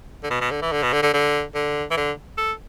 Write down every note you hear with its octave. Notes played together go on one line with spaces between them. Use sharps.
D3
B2
B2
D3
E3
D3
B2
D3
D3
D3
D3
E3
D3
A4